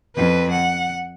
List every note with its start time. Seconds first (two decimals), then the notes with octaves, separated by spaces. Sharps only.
0.16 F2 B4
0.52 F#5